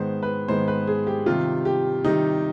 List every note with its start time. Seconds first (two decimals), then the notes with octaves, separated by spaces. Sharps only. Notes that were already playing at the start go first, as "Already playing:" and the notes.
Already playing: G#2 D#3 G#3 B3 C5
0.23 B4
0.48 G#2 D#3 G#3 B3 C5
0.68 B4
0.87 G#4
1.07 G4
1.26 C3 D#3 G3 F4
1.65 G4
2.04 C3 D#3 G3 D#4